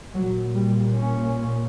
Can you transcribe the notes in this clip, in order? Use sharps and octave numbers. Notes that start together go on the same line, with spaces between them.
A#2 F#3
G3
C#4